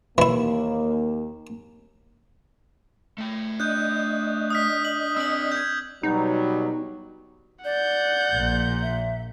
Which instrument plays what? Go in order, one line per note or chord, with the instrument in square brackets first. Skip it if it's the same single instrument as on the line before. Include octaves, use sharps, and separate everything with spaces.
[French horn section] D#2 A#3 [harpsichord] E3 E4
[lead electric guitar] A3 G5
[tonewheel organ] D4 D#5 [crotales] F#6 G6
[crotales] D#6 F6 B6
F#7
[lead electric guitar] C4 D5 [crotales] E6 F#7
[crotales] G6 G#6
[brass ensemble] B2 F#3 G3 [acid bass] D#4
[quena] D5 [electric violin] F#5 G6
[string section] A#1 A#2
[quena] E5